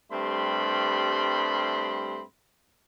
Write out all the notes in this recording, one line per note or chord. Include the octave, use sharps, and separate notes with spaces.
G2 G3 A3 C4 B5 C6